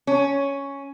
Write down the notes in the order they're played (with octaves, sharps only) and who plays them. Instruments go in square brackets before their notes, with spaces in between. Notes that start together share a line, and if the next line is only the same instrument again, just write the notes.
[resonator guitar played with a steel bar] C#4